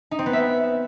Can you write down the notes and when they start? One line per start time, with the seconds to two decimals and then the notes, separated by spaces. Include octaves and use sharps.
0.11 D#4
0.19 C4
0.26 B3
0.33 E5